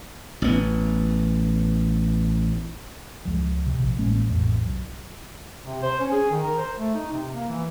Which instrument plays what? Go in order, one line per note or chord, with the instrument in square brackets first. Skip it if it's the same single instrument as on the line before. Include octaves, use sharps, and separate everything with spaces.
[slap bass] A1 B3
[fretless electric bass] C#2 F3
C3
A#1
A1 G#3 A#3 C#4
A1 F2
B1
[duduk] C3
C5
C#4
G#4
D#3
A#4
C5
A3
D#4
C3
A#3
E3